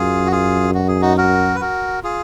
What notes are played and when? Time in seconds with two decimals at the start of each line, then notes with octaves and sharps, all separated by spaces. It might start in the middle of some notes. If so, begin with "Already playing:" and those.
Already playing: F#2 F4 G#4
0.26 F#4
0.32 F4 G#4
0.74 F#4
0.88 G#4
1.01 D#4 F#4
1.17 F#4 A#4
1.55 B4
1.61 F#4 A#4
2.03 F4 G#4